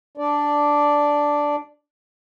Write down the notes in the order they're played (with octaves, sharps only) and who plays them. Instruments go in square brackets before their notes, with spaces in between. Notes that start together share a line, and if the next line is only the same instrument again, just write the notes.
[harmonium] D4 D5